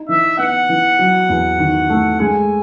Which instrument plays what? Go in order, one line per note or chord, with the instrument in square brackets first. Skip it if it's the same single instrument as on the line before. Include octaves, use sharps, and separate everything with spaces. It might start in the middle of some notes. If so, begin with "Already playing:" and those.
Already playing: [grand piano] D#4
[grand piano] E3 [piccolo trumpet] E5
[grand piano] B3 [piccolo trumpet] F#5
[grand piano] E3
F#3
E2
D#3
A3
[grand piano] G#3 [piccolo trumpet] G#5